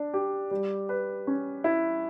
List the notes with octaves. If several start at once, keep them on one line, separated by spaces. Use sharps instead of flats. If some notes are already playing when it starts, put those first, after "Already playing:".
Already playing: D4
G4
G3
B4
C#4
E4